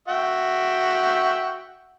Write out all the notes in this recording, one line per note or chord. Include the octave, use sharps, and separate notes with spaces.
F#4 E5 G5